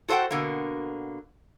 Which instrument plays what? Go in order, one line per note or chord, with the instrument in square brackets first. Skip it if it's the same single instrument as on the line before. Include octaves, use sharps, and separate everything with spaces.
[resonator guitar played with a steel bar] F#4 A4 C5 D#5 F#5 G5
B2 D3 A#3